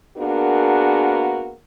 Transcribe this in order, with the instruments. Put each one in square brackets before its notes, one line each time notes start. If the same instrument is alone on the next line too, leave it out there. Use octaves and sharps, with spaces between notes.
[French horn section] A#3 B3 D4 F#4 G#4 A#4